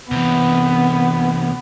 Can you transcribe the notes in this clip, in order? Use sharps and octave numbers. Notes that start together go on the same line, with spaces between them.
C3 E3 B3